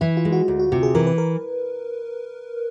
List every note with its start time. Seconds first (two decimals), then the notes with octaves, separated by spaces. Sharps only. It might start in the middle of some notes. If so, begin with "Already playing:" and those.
0.01 E3 E4
0.17 F4
0.25 G#3
0.32 F#4
0.48 D2
0.60 F#4
0.72 C3 F#4
0.83 G#4
0.95 E3 A#4
1.07 B4
1.18 A#4